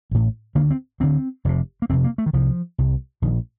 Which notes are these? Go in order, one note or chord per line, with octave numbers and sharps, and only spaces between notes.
A1 A2
D2 D3 A#3
C4
D2 D3 C4
F1 F2 C3
A#3
F1 F2 C3 C4
A#3
A3
D#3
C2 C3 F3
C2 C3
A#1 A#2 D#3